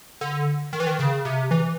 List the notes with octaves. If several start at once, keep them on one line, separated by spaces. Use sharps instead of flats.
D3
D#3
E3
D#3
C#3
C3
E3